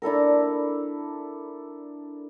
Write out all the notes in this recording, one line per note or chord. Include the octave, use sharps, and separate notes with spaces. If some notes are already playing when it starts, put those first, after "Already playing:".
D4 E4 A4 A#4